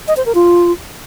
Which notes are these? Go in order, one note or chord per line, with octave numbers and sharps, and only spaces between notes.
D#5
C5
A#4
F4